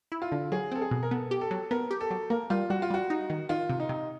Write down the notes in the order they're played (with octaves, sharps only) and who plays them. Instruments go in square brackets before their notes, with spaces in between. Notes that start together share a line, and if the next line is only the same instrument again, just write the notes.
[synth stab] E4
[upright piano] F4
[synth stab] D3
[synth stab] F#3 [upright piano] G#4
[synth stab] C4 [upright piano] A4
[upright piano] G#4
[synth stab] B2
[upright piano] A#4
[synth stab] B3 [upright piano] A4
[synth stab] G4
[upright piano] A4
[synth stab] F#3
[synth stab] B3 [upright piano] A#4
[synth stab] G4
[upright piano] A4
[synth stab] F#3
[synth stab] A#3 [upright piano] A#4
[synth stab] G3 [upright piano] F4
[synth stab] G3 [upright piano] F#4
[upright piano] F4
[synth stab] G3 [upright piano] F#4
[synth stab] D#4
D#3
[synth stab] D#3 [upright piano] F4
[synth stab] C3
[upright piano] D#4
[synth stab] C3